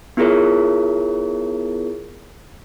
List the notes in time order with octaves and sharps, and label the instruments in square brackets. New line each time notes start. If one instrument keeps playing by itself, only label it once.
[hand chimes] B3 E4 F4 G#4 A#4 C#5